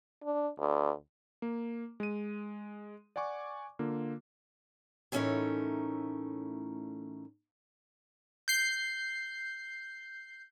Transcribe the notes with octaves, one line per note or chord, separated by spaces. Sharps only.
D4
D2
A#3
G#3 D#7
D5 F#5 G#5 C#6 D6
D3 A#3 F4
A2 E3 A3 C#4 D#4 A#4
G6 C7